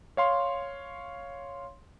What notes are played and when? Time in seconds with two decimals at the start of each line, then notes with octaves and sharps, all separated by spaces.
0.17 C#5 F5 C6